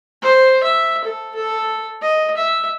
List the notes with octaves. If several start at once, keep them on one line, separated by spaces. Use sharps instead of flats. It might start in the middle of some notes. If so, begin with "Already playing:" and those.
C5
E5
A4
A4
D#5
E5